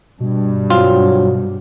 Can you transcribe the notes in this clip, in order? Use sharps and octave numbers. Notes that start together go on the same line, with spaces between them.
G2 B2
F#3 C4 F4